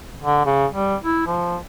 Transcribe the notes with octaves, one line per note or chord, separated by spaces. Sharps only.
D3
C#3
G3
E4
F3